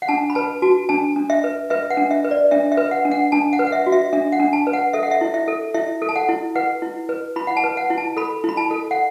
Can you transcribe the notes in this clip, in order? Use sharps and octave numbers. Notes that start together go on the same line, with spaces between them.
F#5
D4 A5
B5
B4 A5
F#4 A5
D4 A5
D4
E5
B4
B4 E5
F#5
D4
E5
B4
D5
D4 E5
E5
B4
F#5
D4
F#5
D4 A5
F#5
B4
F#5
E5
F#4
E5
D4 E5
F#5
D4
A5
B4
F#5
A4 E5
F#5
E5
E4
E5
A4
E4 E5
A4
A5
F#5
E4
B4 F#5
E4
B4
E4 B5
F#5
A5
B4
F#5
E4
A5
A4 B5
E4 B5
A5
A4
F#5